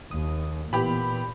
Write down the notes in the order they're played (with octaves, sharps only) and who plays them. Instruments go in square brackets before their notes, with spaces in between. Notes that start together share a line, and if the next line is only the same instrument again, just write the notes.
[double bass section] D#2 [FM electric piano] D#6
[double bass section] A#2 [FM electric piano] E3 B3 [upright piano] G4 B5